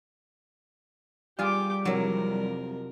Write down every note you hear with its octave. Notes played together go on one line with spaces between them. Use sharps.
G3 F4 G4 G#4 D6
F2 C3 F#3 E4 A#4